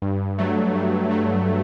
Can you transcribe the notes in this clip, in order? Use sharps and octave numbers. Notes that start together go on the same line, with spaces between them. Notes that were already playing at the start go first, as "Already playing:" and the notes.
G2
F#3 A3
G2
F#3 A3